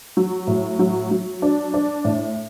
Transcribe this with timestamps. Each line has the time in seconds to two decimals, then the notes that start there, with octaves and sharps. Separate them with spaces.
0.17 F#3
0.47 A2
0.79 F#3
1.11 F#3
1.42 D4
1.74 D4
2.05 A2